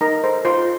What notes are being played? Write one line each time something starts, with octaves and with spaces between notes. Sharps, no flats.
D#4 A#4 A#5
A4 C5
F4 C5 C6